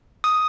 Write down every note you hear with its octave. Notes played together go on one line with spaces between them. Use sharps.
D#6